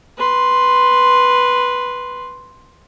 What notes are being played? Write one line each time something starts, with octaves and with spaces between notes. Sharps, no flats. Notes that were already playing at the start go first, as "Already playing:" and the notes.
B4 C6